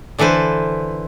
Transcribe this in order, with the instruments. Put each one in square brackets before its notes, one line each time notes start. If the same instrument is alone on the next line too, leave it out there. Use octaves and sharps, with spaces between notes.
[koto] D3 E3 A4 B4 C5